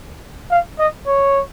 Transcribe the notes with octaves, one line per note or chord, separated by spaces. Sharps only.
F5
D#5
C#5